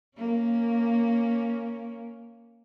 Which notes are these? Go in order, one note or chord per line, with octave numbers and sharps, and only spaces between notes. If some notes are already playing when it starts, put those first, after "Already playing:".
A#3 C#4